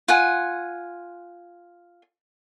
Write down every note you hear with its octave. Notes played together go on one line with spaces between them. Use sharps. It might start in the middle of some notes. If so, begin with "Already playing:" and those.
F4 F#5 G#5